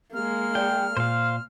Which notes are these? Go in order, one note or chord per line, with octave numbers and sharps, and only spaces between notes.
G#3 A#3 F6
D5 G5
A#2 C5 F5